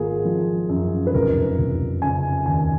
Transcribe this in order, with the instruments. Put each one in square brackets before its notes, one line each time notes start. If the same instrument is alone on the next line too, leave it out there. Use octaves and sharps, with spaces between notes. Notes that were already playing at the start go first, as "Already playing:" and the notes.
Already playing: [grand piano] G#1 A#3 F4 G#4
F3
F#2
B4
F1 A#4
F1
C#3 G#5
D#2 G#5